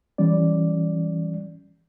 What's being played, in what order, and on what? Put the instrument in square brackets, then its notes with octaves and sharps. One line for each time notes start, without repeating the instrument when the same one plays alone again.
[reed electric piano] E3 G3 C#4 D5